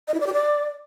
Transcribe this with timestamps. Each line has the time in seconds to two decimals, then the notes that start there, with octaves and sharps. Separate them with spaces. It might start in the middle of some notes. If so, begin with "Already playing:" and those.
0.08 D#5
0.14 E4
0.20 D5
0.27 G4
0.33 D5